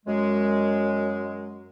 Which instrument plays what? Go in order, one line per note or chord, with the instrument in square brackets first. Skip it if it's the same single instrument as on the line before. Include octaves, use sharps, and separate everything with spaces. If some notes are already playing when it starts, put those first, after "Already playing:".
[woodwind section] F#2 G#3